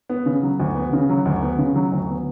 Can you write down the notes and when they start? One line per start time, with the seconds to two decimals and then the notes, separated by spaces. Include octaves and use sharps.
0.09 B3
0.26 C#3
0.43 F#3
0.60 D2
0.75 B3
0.93 C#3
1.09 F#3
1.25 D2
1.42 B3
1.59 C#3
1.75 F#3
1.92 D2
2.09 B3